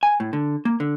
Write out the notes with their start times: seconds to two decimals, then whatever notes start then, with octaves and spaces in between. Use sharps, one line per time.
0.03 G#5
0.20 A2
0.33 D3
0.65 A#3
0.80 D3